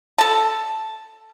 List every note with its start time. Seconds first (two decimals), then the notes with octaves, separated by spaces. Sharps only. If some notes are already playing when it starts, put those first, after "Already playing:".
0.18 A4 A5